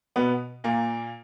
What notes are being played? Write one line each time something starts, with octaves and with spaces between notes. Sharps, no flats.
B2 B3
A#2 A#3